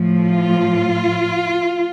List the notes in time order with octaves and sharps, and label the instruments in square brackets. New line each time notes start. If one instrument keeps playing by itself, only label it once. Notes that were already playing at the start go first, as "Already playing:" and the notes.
Already playing: [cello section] A2 F3
F4